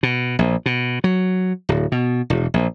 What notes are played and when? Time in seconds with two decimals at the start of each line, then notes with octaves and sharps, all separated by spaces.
0.03 B2
0.39 A#1
0.66 B2
1.04 F#3
1.69 D1
1.92 B2
2.30 E1
2.54 A#1